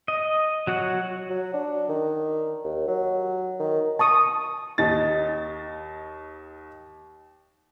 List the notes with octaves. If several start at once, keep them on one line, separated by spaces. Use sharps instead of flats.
D#5
F#3 F#4 C#5 F#5
F#3
D4
D#3
D#2
F#3
D#3
A5 C#6 D#6
D#2 D#4 A6